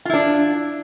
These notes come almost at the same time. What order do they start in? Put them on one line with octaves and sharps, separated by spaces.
F4 E4 D4